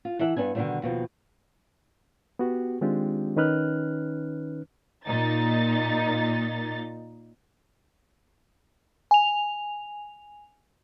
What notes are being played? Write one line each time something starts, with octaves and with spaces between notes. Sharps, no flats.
F4
E3 A4 E5 F#5
G2 B3 D4 G#5
B2 D3 D#3 F3 G3 A3
D#2 B2 F3
B3 F#4 G4
D#3 G#3 C4 D4 F4 G4
D#3 C#4 D#4 B4 F6 F#6
A#2 D#4 A6
G#5 F7